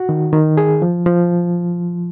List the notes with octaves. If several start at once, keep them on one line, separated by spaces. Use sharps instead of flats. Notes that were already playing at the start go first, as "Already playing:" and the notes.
Already playing: F#4
D#3
D#3
G#4
F3
F3